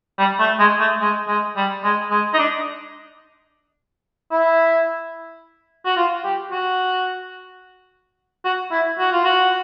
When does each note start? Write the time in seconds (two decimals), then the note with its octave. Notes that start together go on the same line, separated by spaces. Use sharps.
0.18 G3
0.39 A3
0.59 G#3
0.80 A3
1.01 G#3
1.28 G#3
1.57 G3
1.84 G#3
2.11 G#3
2.34 D#4
2.39 D4
4.31 E4
5.85 F#4
5.97 F4
6.25 G4
6.51 F#4
8.44 F#4
8.72 E4
8.99 F#4
9.12 F4
9.24 F#4